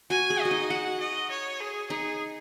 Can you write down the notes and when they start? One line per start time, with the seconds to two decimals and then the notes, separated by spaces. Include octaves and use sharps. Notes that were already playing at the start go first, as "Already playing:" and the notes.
0.10 F#4 G#5
0.30 G#4
0.40 F#4 D#5
0.51 D#4
0.70 F#4 F#5
1.00 D#5
1.31 C#5
1.60 G#4
1.90 D#4 G#4